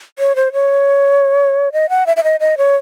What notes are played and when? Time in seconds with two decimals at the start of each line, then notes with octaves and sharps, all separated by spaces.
0.19 C#5
0.36 C5
0.53 C#5
1.72 D#5
1.89 F#5
2.07 E5
2.17 E5
2.24 D#5
2.40 D#5
2.58 C#5